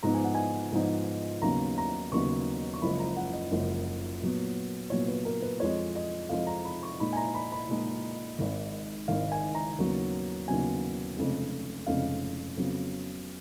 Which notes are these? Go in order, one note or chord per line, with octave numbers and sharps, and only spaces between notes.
G#2 F3 B3 D#4 A#5
G#5
F#5
G#5
G#2 F3 B3 D#4
D#2 C#3 F#3 B3 D#4 A#5
A#5
D#2 C#3 F#3 B3 D#4 C#6
C#6
F#1 F#2 F3 G#3 B5
A#5
F#5
D#5
F#1 F#2 F3 G#3
A#2 F#3 B3
A#2 F#3 B3 C#5
B4
A#4
B4
F2 F3 G#3 C#5
D#5
F2 F3 G#3 F5
A#5
B5
C#6
A#2 G#3 D#4 B5
G#5
A#5
B5
B5
A#2 G#3 D#4
G#1 G#2 D#3
G#1 G#2 D#3 F5
G#5
A#5
D#2 C#3 F#3 B3
D#2 C#3 F#3 B3 G#5
F1 F2 C#3 G#3
F1 F2 C#3 G#3 F5
F2 C#3 F#3 B3